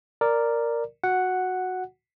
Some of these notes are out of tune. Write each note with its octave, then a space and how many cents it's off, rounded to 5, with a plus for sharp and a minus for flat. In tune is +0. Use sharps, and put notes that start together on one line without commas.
A#4 -5 D5 +0
F#4 -10 F#5 +0